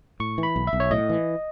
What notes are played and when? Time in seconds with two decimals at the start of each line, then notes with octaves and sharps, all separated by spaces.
0.20 A2 C#6
0.38 E3
0.43 B5
0.56 B1
0.67 E5
0.73 B1
0.80 C#5
0.91 A2 D#5
1.09 E3